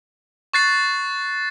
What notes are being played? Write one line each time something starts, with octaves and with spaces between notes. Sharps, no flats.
C#6 F#6 A6 C7